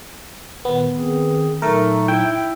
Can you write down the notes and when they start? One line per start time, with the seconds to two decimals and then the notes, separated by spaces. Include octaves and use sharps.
0.65 A#2 D#3 B3
0.98 D#3 C4 G#4
1.62 A#2 F#3 A3 D#4 A#4
2.08 E4 G5